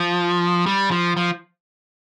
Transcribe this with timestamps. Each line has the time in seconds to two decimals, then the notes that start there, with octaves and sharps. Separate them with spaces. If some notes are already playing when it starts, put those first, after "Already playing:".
Already playing: F3
0.66 G3
0.91 F3
1.17 F3